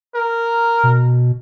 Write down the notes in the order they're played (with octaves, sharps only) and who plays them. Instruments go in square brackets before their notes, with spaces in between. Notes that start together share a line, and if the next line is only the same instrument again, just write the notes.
[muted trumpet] A#4
[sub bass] B2